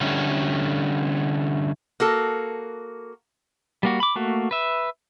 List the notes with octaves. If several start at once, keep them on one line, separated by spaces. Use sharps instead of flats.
D3 G3 A3 C#4
A#3 F#4 A4
G3 A#3 F#4
B5 D6
A3 A#3 F#4
B4 E5